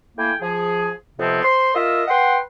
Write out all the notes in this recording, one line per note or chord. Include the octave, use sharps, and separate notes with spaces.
A3 A#3 E4 G5 G#5
F3 G#4
F2 C3 F3 B3 C4
C5 C6
F4 A#4 D#5 E5
B4 F#5 G5 C6